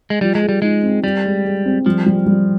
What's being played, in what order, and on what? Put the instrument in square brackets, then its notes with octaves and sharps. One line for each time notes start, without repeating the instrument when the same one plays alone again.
[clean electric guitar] G#3
[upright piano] F3 [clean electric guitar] G3
[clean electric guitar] G#3
[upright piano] G#4
[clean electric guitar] G3
[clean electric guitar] G#3 [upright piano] D#4
[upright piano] C4
[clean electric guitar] G3 [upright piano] G4
[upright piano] G#3
G#3
C4
[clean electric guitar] F3 [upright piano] G3
[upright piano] G3
G3